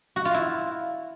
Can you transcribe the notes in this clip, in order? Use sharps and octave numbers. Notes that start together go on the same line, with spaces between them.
F#4
F4
E4